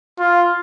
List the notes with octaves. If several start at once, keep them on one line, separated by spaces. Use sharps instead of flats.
F4